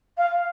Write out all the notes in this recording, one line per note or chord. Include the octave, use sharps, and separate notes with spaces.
F5